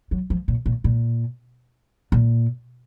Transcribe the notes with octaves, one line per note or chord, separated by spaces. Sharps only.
F#3
F3
A#2
A#2
A#2
A#2